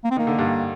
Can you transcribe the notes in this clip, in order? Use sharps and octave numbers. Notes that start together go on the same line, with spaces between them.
A#3
C4
D#3 A#3
D3
G2